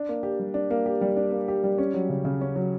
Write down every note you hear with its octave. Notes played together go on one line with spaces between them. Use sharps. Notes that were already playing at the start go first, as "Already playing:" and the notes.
Already playing: D4
A#3
G4
G3
D4
A#3
G4
G3
D4
A#3
G4
G3
C#4
F#3
C#3
C#3
C#4
F#3